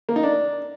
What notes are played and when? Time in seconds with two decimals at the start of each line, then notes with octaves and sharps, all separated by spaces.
0.09 A#3
0.16 D#4
0.23 D4